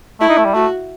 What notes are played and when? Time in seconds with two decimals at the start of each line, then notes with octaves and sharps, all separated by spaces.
0.20 A3 E4
0.29 D#4
0.38 A3
0.45 G3
0.54 A3 F#4